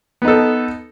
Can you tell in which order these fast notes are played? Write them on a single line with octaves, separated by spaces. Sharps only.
B3 D#4 A4